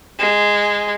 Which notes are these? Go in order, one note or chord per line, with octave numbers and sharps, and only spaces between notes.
G#3